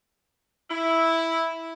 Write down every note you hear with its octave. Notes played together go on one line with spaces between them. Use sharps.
E4